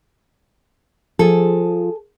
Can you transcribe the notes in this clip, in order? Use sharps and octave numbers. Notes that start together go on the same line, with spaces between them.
F3 G#4 A4